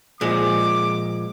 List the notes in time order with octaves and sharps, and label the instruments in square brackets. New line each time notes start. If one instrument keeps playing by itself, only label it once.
[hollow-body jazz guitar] A#2 F3 G#3 [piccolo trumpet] D6